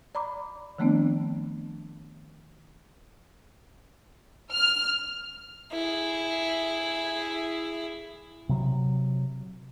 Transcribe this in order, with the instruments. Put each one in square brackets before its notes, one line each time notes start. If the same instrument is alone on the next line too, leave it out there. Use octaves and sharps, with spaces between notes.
[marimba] D5 A#5 B5 D6
D#3 F3 A3 B3 C4 D4
[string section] F6
[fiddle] E4 G#4
[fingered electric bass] C3 F#3